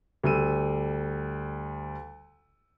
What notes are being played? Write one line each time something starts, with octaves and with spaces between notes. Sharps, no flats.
D2 G3 E6 D#7